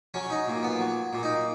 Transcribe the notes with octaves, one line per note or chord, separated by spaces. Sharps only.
F#3 C#4
D#4
A#2
B3
F#3
A#2
D#4